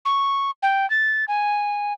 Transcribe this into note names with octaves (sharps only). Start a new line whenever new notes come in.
C#6
G5
A6
G#5